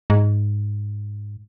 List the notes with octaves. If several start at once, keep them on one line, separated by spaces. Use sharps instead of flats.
G#2